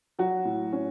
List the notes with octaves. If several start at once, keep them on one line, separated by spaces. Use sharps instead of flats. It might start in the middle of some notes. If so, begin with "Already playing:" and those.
F#3 F#4
A2
C#4